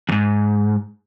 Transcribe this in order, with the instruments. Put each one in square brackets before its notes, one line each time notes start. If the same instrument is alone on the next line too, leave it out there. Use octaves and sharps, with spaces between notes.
[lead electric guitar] E2 G#2